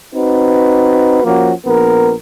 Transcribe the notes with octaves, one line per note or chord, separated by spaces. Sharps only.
C4 D#4 F#4 B4
F3 A#3 C#4 F#4
A#1 B3 A#4